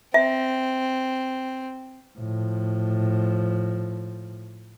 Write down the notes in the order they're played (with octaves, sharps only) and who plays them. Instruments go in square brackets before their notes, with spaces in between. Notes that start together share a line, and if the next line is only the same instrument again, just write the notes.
[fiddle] C4 [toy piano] E5
[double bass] A2 F3